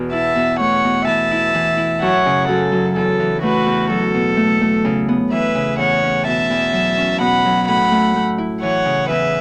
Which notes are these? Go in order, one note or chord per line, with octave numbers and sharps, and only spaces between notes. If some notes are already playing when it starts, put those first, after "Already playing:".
Already playing: E2 B2 F#4
E4 E5 A5
B2
A3 C#5 F#5
B2
E3 E5 A5
E4
E3
E4
F#2 C#5 F#5
C#3
F#2 A4
F#3
E2 A4
E3
A3 F#4 B4
E2
F#3 A4
B2
A3
A3
C#3
B3
E3 B4 E5
C#3
E2 C#5 F#5
C#4
B2 E5 A5
E2
F#3
C#4
B2 F#5 B5
F#3
A2 F#5 B5
A3
A3
E4
E3 C#5 F#5
C#3
E2 B4 E5